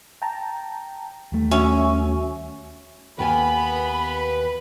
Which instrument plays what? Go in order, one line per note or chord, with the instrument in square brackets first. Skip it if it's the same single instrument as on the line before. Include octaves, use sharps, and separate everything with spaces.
[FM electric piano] G5 A5 A#5
[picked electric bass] D#2 G3 A3
[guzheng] C#4 [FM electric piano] F#4 E5
[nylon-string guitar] D#2 A#4 G#5 [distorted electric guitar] B4 F#5 [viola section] B5